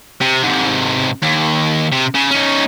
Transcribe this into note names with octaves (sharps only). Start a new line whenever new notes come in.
C3
G#2 C3
D#2
C3
C#3
C#4 D#4